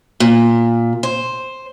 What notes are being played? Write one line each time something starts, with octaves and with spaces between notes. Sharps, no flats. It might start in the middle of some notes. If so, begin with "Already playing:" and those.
A#2
C5